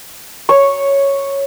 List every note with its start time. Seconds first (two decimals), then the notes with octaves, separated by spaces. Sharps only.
0.49 C#5 C#6